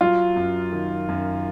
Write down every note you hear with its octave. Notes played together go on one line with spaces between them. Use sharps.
F#3 F4
F#2
D#3
F#2